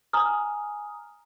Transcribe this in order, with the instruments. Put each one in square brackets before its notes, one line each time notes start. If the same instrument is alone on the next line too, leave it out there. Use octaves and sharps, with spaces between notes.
[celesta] G#5 A#5 D#6 F6